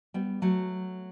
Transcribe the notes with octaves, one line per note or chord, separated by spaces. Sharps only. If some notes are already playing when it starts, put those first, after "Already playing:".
G3 B3
F#3 A3